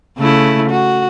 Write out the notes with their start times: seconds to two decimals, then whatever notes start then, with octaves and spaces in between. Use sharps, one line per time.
0.18 C#3 A3 E4
0.70 F#4